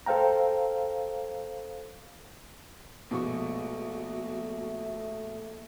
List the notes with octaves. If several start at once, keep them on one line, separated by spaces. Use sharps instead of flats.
A4 C5 F5 G5 A#5
A#1 B2 G#3 A3 F#4 C#6